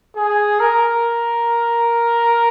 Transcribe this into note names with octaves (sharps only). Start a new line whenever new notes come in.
G#4
A#4